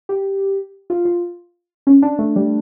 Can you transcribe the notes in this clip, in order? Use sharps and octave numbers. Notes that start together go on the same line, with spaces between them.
G4
F4
F4
C#4
D4
A3
G3